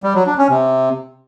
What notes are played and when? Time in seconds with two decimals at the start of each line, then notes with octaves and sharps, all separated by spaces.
0.03 G3
0.15 F#3
0.26 D4
0.38 C#4
0.49 C3